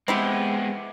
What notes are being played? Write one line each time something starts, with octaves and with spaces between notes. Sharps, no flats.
G#3 B3 C4 E4 G4